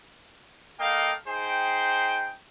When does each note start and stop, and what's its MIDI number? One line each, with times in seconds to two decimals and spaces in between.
0.80 1.13 58
0.80 1.13 69
0.80 1.13 75
0.80 1.13 77
0.80 1.13 79
1.28 2.33 63
1.28 2.33 68
1.28 2.33 72
1.28 2.33 79